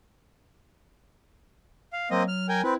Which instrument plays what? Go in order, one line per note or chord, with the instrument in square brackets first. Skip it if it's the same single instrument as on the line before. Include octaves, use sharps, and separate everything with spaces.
[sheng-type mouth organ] F5
[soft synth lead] F#3 [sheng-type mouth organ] A#3 C4 D#5
[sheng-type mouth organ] F6
A#4 G5 G#5
[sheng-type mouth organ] C4 B4 [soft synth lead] E4